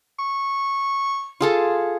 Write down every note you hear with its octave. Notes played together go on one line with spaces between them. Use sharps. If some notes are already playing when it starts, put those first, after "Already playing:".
C#6
F4 G#4 A4